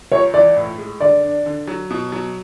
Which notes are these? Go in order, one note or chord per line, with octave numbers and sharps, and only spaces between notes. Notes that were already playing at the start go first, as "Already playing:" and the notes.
C#2 C#5
E3 D5
A2
G#3
D3 D5
D4
D3
F#3
B2
F#3